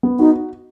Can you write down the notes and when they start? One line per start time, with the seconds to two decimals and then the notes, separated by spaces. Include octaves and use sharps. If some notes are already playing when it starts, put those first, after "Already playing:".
0.03 B3
0.19 D#4 F#4